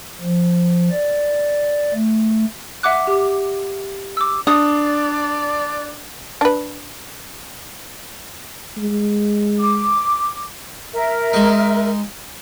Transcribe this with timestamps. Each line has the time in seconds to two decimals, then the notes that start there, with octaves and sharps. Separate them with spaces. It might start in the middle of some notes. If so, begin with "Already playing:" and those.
0.21 F3
0.91 D5
1.94 A3
2.83 E5 F#5 D6 F#6
3.07 G4
4.17 D6 E6
4.47 D4 D5 D#6
6.41 D4 B4
8.77 G#3
9.60 D6
10.94 A#4 E5
11.33 G#3 D#4